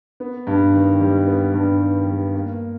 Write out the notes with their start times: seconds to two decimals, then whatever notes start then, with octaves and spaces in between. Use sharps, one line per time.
0.20 B3
0.47 G2
0.74 D#3
1.01 G3
1.27 B3
1.54 G2
1.81 D#3
2.08 G3
2.34 A#3